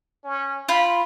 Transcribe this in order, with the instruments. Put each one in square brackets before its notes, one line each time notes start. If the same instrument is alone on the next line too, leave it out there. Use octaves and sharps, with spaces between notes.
[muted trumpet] C#4
[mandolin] F4 [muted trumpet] B5